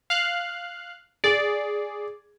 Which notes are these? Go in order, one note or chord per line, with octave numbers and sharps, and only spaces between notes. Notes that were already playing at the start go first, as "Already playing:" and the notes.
F5 F#6
G#4 D5